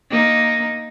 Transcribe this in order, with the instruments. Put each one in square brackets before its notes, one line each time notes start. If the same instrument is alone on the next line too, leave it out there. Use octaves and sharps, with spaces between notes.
[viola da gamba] A#3 D#4